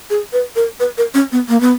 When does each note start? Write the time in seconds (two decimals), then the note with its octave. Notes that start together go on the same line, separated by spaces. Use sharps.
0.10 G#4
0.33 B4
0.56 A#4
0.80 B4
0.98 A#4
1.14 C#4
1.32 B3
1.49 A#3
1.61 B3